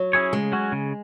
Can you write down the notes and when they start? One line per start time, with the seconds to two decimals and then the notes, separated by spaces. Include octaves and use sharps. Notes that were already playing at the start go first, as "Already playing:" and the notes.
Already playing: F#3
0.13 C#4 E4 G#4 C#5
0.33 C#3 G#3
0.52 F#3 C#4 F#4
0.72 C#3